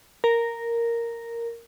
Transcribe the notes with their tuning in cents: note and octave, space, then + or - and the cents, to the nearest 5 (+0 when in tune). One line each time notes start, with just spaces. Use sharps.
A#4 -5